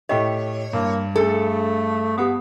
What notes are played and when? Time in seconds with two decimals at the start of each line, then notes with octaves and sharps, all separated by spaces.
0.09 A2 G4 C#5 D#5 E5 G5
0.73 G2 A#3
1.16 A3 D4 G#4 A4
2.18 B3 G4 F#5 D#6